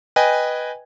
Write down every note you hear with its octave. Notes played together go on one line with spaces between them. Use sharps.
B4 D#5 G5 G#5